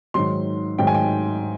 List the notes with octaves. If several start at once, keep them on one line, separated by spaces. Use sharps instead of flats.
G#2 D#3 F#3 C6
G#2 D#3 F#3 G5
G#5
G5